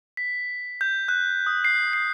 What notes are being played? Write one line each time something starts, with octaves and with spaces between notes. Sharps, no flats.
B6
G6
F#6
D#6
C7
C7